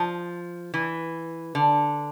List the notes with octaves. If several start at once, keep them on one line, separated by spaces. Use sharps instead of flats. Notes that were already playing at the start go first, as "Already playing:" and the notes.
Already playing: F3
E3
D3